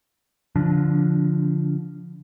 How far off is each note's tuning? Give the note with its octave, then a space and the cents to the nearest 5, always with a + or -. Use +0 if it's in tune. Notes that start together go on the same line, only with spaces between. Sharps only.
D3 -30 F3 -10 D4 -5